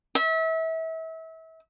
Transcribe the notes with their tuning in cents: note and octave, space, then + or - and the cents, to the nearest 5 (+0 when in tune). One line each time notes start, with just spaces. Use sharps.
E5 -30